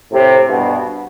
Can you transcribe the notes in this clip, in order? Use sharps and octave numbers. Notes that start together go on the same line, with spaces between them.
A2 C3
G2 B2